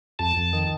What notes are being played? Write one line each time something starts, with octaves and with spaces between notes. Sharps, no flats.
F2 A5
F2
D#3